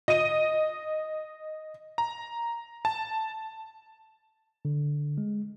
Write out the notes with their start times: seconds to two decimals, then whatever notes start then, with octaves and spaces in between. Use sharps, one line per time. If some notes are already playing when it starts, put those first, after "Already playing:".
0.08 D#5 D#7
1.98 A#5
2.85 A5
4.65 D3
5.18 G#3